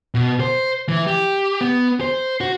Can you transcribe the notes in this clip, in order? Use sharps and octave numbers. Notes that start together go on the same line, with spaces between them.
B2
C5
E3
G4
B3
C5
F#4